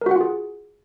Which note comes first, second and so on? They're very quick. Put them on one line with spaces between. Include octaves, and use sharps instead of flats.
A#4 F#4 F#5 F4 G#4